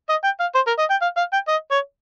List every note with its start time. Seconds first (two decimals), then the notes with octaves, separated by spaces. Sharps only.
0.09 D#5
0.24 G5
0.40 F5
0.55 C5
0.67 A#4
0.78 D#5
0.90 G5
1.02 F5
1.17 F5
1.33 G5
1.48 D#5
1.71 C#5